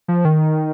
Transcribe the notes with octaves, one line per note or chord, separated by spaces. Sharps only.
F3
D#3